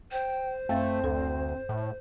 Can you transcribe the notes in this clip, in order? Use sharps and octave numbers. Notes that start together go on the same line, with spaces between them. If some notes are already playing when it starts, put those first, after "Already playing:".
C5 G5
F#2 A3 C4 F5 A6
D2 A4
A2